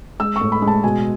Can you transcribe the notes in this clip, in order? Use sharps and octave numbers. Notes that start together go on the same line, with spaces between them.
G#3 E6
C#6
A2
B5
G#3
A5
B2 G#5